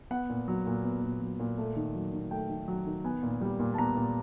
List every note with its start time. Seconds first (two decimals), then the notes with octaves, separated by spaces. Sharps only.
0.11 B3 F#5
0.30 A#2
0.48 F#3
0.67 A#2
0.84 B3
1.03 A#2
1.21 F#3
1.40 A#2
1.58 A3
1.76 D#3
1.94 F#3
2.13 D#3
2.31 A3 G5
2.49 D#3
2.68 F#3
2.87 D#3
3.04 B3 G#5
3.23 A#2
3.41 G3
3.59 A#2
3.74 A5
3.78 B3 A#5
3.96 A#2